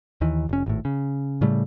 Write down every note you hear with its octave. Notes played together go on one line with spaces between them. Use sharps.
D#2 D#3 E3
F1 C#4
G#1 A2
C#3
A2 C#3 G3 A3